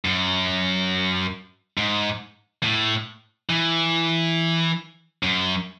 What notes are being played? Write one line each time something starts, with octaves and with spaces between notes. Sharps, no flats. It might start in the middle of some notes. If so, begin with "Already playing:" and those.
F#2
G#2
A2
E3
F#2